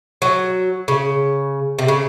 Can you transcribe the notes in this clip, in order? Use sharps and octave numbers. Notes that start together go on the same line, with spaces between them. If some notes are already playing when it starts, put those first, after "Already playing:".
F#3
C#3
C3
C#3